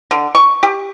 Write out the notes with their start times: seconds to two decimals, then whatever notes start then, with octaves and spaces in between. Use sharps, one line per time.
0.11 D3
0.35 C#6
0.63 G4